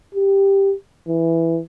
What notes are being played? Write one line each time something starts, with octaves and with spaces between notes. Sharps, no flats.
G4
E3